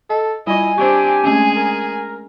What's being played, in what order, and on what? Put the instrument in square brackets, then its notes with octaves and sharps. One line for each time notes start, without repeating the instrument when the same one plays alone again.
[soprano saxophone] A4 [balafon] D#5
[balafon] G3 F4 [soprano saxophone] E4 [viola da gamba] D#5 [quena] G#5
[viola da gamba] C4 D4 [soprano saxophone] G4 [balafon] C5 C#6
[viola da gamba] G#3 G#4 [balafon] A3 C4 C#4
[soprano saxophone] A#4